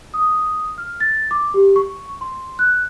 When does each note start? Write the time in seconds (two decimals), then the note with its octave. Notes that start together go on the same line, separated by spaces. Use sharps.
0.14 D#6
0.78 F6
1.00 A6
1.31 D6
1.54 G4
1.76 C#6
2.21 C6
2.59 F#6